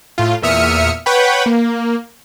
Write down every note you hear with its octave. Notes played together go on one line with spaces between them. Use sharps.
A2 F4
E2 A#2 E5 D#6 F6 C#7
B4 C#5 F#5 G5 B5
A#3